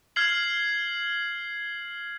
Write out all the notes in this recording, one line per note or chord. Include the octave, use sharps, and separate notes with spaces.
F6 G#6 C7 F#7